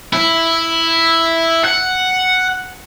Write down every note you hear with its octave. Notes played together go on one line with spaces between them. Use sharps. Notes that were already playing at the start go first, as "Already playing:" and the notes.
E4
F#5